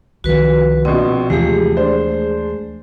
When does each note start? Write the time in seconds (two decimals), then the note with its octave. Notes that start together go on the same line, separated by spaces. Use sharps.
0.24 C2 D#3 F3 F#4 B4
0.85 A#1 B2 C4
1.30 D#2 C3 E3 F3 G#3 A3 G#4
1.76 D4 C5